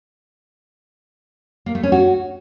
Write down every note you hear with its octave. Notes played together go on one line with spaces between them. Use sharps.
A#3
A3
C#4
F#4